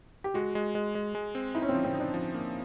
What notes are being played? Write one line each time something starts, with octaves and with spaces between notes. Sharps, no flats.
G4
G#3 F#4
G#3
G#3
G#3
G#3
C4
D#4 E4
C#4
C4
F3
C4
D#4
D4
F3
A#3